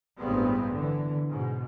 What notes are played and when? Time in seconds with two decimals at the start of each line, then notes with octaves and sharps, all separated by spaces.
0.18 A1 G2 G3 G#3 B3 C4
0.74 D3 E3
1.28 G#2 B2